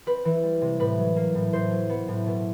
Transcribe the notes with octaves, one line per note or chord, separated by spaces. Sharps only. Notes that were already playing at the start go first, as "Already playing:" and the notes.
C4 B4
E3
G3
C3
A2 B4
F#3
A#3
A2
A2 C5
F#3
B3
A2
B2